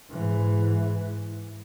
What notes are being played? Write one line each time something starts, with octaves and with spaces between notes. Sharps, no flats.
G#2 E3